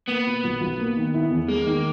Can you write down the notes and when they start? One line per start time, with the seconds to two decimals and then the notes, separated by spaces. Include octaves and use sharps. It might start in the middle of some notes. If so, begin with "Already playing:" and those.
0.08 A#3 B3
0.26 B2
0.44 B1
0.61 B1
0.79 A#3
0.97 D#3
1.14 E4
1.31 E2
1.48 G#3 A#3
1.66 D#3